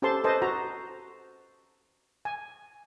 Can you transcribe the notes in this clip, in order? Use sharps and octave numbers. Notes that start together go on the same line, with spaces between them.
C#4 G4 A4 C5 A5 C6
A4 B4 C5 D#5 A5
F#4 A#5
G#5